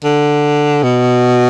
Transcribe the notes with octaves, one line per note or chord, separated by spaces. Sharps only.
D3
B2